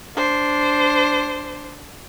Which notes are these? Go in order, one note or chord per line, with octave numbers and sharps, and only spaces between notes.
D4 C5